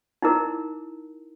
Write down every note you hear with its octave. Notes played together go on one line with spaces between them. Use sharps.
D#4 E4 A#4